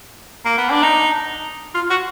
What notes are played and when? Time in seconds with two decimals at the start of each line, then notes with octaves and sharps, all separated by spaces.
0.45 A#3
0.58 B3
0.70 D4
0.83 D#4
1.74 F4
1.90 F#4